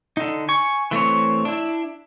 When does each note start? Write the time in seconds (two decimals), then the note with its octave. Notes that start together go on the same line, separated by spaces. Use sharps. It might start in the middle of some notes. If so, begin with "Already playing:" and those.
0.17 D3 D#4
0.49 G#5 C#6
0.91 E3 A3 C4 C#5
1.45 D4 E4